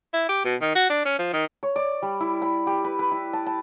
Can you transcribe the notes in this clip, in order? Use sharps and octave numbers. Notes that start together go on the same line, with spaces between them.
E4
G4
B2
D#3
F#4
D4
C#4
F3
D#3
C#5
D5
G3
E4
B5
G4
B4
B4
E4
A5
A5